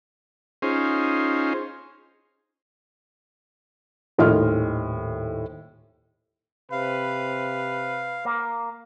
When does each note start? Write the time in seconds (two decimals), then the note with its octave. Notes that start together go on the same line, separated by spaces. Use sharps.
0.62 C#4 D#4 F4 G#4 C5
4.18 D#1 A2 D#3 D#5 C6 F6
6.72 C3 B4 F5
8.25 A#3